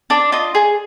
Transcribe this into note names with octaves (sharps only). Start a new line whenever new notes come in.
D4 D5
F4 D#5
G#4